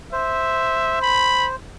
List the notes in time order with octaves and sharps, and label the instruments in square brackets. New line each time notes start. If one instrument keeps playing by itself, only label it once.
[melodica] C5 [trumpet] E5
[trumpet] B5